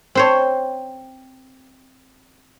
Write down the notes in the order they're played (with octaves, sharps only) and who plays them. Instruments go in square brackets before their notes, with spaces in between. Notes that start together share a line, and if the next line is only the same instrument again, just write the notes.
[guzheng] C4 C5 C#5